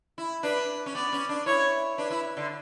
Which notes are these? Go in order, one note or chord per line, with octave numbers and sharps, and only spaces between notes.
E4
D4 B4
C#4
B3 D5
C#4
D4
E4 C#5
D4 B4
E4
D3